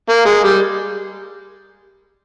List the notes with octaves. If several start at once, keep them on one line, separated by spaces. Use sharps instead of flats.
A#3
G#3
G3